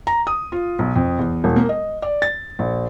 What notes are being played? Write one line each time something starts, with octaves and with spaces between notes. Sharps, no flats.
A#5
D#6
F4
B1
F2
E2
E1
A#3
D#5
D5
A6
A#1